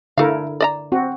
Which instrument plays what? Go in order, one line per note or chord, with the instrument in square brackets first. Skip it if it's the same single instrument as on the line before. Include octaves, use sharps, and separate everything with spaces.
[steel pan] D3 E4 A#4 [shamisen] A3 F5
[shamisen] D5 D#5 A#5
[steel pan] C4 F#4